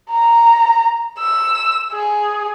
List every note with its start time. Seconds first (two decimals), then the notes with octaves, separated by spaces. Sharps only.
0.10 A#5
1.19 E6
1.93 G#4